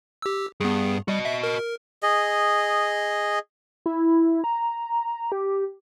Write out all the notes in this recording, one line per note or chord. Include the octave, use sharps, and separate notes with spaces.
G4 E6
G2 B3 G#4
G3 F#4 D#5
E5
A#4
G#4 D#5
E4
A#5
G4